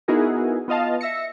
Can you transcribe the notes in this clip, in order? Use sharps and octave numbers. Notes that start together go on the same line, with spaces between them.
B3 D#4 E4 F#4 G#4 A#4
B3 F4 D#5 F5 A5
E5 E6 A#6 C#7